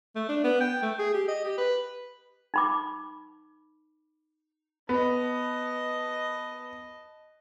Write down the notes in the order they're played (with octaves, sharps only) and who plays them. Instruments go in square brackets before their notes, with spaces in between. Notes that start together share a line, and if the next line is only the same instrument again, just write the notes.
[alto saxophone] A3
D4
B3
G5
A3
G#4
G4
D#5
G4
B4
[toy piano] D#4 B5 D6
[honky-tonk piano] B3 [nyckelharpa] D#5 A5